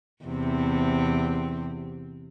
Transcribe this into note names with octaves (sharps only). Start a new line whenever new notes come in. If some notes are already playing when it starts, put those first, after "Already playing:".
E2 C3 C4